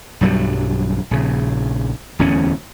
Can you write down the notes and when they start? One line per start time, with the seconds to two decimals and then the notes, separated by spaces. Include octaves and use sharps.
0.21 B1 G2 F#3 G3
1.11 A#1 C#3
2.19 D1 E2 A2 C#4